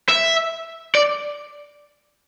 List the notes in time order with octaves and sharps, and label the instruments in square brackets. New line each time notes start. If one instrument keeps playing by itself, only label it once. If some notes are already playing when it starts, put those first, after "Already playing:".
[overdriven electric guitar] E5
D5